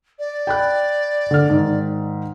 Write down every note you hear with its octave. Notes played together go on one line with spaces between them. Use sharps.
D5
G5 B5 F#6
D3 F6
G#2 D#3